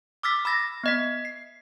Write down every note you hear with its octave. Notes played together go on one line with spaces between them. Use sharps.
D6 E6 F6 A6 B6
B5 E6 A6 A#6
B3 D#5 B6
C7